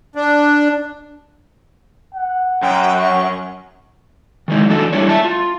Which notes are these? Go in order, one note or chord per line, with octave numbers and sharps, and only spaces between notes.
D4
F#5
F#2 G5
C#6
D#3 E3 G#3 D#4
E3 D4 F#4 A4
G3 D4 E4 C#5
E5 A5
F4